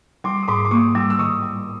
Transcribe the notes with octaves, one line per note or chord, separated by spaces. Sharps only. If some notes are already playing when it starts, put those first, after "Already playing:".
G3 C6 D6
D#6
G#2 C6 D6
D6
A#3 C#6 D#6
G3 D6 E6
E6
D#3 C#6 D#6
G3